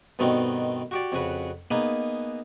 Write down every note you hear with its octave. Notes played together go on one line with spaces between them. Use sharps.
G2 B2 D#3 A3 B3 C4
F#4 G4 D5
F2 C#3 F#4 B4
A#3 B3 D#4 G#4 B4